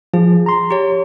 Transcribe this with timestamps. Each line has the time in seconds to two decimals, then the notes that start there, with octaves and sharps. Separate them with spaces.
0.14 F3 G#4
0.46 A#5 C6
0.71 G4 C#5